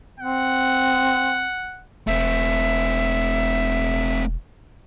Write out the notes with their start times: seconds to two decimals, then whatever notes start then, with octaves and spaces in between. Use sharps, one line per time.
0.20 C4 F#5
2.07 E1 A3 C4 E5